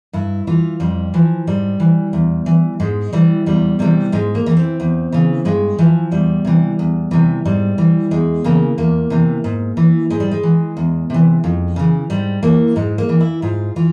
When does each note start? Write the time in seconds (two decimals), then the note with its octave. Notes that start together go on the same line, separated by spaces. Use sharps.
0.13 G2 E4
0.47 E3 F4
0.80 F2 G3
1.14 E3 F3
1.47 G#2 G3
1.80 E3
2.13 E2
2.46 E3
2.80 G#2 G#3
3.13 E3 G3
3.46 E2 G3
3.79 C3 E3 G3
4.12 G#2 G#3
4.35 A#3
4.46 E3
4.57 C4
4.80 E2
5.12 C#3 E3
5.45 G2 G#3
5.79 E3 F3
6.11 E2 G3
6.45 C3 E3
6.79 E2
7.11 C3 E3
7.45 G#2 G3
7.78 E3
8.11 E2 G#3
8.44 C#3 E3 A#3
8.78 E2 A#3
9.10 C3 E3
9.44 G#2
9.77 E3
10.10 G#2 G#3
10.20 G3
10.31 G#3
10.43 E3
10.77 E2
11.10 C3 E3
11.44 F2
11.76 C#3 E3
12.10 G#2 G3
12.43 E3 A#3
12.76 G#2 G#3
12.98 A#3
13.09 E3
13.20 E4
13.42 G#2 F4
13.76 E3 F4